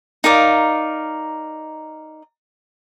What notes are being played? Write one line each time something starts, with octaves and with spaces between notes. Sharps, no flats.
D#4 A#4 D5 F5